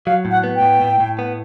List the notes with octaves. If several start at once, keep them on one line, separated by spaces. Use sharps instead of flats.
F#3 F5
A2
F#5
B3
G5
A2
A2
A2
B3